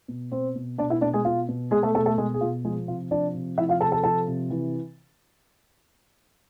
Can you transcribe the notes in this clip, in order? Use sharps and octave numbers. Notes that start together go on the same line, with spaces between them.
B2
B2 C4 C5
B2
B2 D4 D5
E4 E5
B2 D4 D5
G#3 G#4
B2 F4
B2
B2 G#3 G#4
A3 A4
B2 A3 A4
A3 A4
B2 G#3 G#4
G#4
B2 F4
F3 G#3 G#4
C3 F4
F3 D4 D5
C3
F3 E4 E5
F4 F5
C3 A4 A5
A4 A5
F3 A4 A5
C3
E3